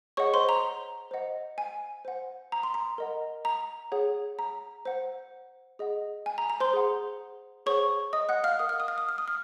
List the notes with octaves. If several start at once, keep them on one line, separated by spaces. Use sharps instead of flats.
G#4 C#5 D#5 F#5 C#6
C5 C6
A#5
C5 D#5 F#5
G#5
C5 F#5
A#5
C6
A#5
A#4 D#5 F#5
A#5
G#4 C#5 F#5
A#5
C5 F#5
G#4 D#5 F#5
G#5
A#5
A#5
C5 C6
G#4 C5 F#5
G#4 C5 C#5 F#5 C#6
D#5 D#6
F#5 F#6
F5 F6
A#4 D#5 F#5 D#6
F6
D#6
F6
D#6
F6
D#6
F6